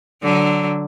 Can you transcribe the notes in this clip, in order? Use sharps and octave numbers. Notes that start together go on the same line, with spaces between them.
D3 F#3